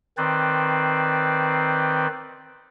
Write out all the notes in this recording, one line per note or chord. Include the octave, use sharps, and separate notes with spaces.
D#3 C4 B4 C5 D5